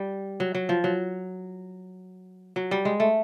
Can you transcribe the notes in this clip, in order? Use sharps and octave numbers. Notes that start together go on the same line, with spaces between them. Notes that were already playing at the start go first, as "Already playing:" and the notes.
Already playing: G3
F#3
F#3
F3
F#3
F#3
G3
G#3
A3